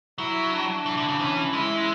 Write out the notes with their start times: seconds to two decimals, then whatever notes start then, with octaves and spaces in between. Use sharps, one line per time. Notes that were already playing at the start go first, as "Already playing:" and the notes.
0.18 F#3 E4
0.53 D4
0.86 E3
0.97 D3
1.08 C#3
1.19 E3 C#4
1.52 G#3 E4